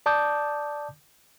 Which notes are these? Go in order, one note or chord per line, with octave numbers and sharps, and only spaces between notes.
D5 A5 D6 D#6 G6